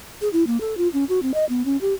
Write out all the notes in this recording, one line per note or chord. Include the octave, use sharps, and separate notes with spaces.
G#4
E4
A#3
A4
F4
C#4
F#4
C4
D#5
B3
C#4
G4